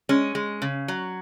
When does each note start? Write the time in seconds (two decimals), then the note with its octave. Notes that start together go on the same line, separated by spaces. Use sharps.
0.09 G#3 C#4
0.35 G#3
0.62 C#3
0.88 F#3